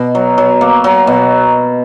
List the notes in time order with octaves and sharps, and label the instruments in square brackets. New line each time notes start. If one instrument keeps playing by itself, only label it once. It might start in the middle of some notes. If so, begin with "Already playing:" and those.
Already playing: [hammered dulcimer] B2
F#3
F#3
A#3
F#3
B2